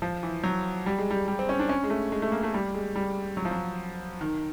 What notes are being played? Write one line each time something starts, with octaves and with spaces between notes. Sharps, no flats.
F3
E3
F#3
G3
G#3
G3
G3
C4
C#4
D4
C#4
G#3
A3
G#3
A3
A#3
A3
G3
G#3
G3
F#3
F3
F#3
D#3